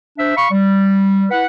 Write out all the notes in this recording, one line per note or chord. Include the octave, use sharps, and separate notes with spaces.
D4 C5 E5 E6
F5 B5 C#6
G3
E4 B4 F#5